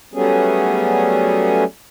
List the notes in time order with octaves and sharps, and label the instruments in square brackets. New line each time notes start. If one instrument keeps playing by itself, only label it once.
[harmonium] F#3 G3 A3 B3 C#4 G#4